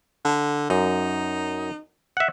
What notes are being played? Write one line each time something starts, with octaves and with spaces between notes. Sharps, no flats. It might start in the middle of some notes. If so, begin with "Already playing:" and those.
D3
F#2 D#4
E5 F#5